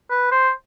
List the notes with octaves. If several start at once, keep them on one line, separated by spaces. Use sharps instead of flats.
B4
C5